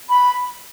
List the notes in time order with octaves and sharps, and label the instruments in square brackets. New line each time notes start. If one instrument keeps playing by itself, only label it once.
[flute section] B5